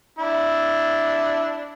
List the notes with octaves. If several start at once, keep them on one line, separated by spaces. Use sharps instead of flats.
D4 E4